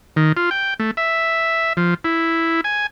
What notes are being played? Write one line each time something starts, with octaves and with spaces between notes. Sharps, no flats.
D#3
F4
G5
A3
E5
F3
E4
G#5